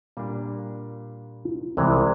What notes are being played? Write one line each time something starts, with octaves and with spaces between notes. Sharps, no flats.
A#2 G3 A#3 D4
C2 C3 E3 G#3 C4